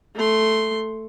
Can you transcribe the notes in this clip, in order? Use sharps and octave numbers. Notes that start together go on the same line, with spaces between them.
A3 C6